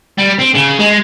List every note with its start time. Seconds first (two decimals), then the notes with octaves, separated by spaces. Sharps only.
0.18 G3
0.39 C4
0.55 C#3
0.79 G#3